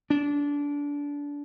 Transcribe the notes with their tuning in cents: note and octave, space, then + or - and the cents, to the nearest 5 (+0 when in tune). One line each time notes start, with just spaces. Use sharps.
D4 -25